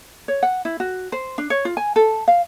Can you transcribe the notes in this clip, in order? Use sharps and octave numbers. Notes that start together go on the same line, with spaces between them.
C#5
F#5
E4
F#4
C5
D4
C#5
F4
G#5
A4
F5